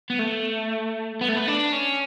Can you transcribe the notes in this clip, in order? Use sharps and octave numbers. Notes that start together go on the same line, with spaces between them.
B3
A3
B3
A3
B3
D4
C#4